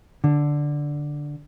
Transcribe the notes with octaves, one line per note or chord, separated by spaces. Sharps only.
D3